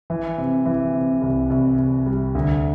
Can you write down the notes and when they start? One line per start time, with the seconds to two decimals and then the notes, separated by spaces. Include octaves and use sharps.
0.10 E3
0.38 C3
0.66 E3
0.94 C3
1.22 C2
1.50 C2
1.78 C2
2.06 G3
2.35 D2